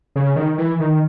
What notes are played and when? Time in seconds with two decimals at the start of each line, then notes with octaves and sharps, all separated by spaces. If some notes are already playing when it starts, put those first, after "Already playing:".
0.16 C#3
0.36 D#3
0.58 E3
0.80 D#3